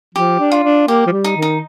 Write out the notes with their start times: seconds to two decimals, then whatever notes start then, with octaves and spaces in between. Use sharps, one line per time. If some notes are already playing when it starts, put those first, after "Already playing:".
0.15 F3 G4
0.40 D4
0.52 F4
0.64 D4
0.88 A#3 G4
1.06 F3
1.12 G3
1.24 D#4
1.37 D#3
1.42 D#4